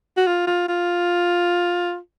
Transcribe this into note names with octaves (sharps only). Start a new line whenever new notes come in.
F#4
F4
F4
F4